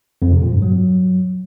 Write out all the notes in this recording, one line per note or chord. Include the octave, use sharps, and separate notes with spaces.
F2
C3
A#2
G2
F#3